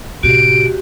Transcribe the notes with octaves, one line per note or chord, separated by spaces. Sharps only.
A2 C3 F#4 G4 D7